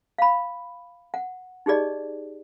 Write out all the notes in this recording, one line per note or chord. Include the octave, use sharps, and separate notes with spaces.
F5 B5
F#5
D#4 G4 G#4 D5 D#5